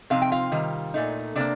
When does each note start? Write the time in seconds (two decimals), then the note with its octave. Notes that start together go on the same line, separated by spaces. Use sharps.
0.10 C3 F3 C4 D#4 F5
0.22 G5
0.32 F4 F5
0.52 C3 D#3 G3
0.94 A#2 A3 D#4
1.36 C3 G3 A#3 D4 D5